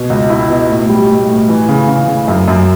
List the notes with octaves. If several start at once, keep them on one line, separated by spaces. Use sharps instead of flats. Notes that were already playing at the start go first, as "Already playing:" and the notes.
Already playing: B2
C#2
E4
B2
A2
G3
A2
A2
E3
C#3
C#3
C#3
F#2
F#2